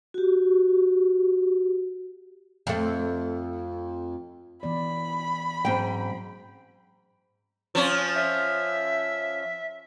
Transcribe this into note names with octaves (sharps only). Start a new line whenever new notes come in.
F#4 G4
F2 A3
E3 B3 D5 B5
G#2 F#3 C4 C#4 G5
F3 C#4
E5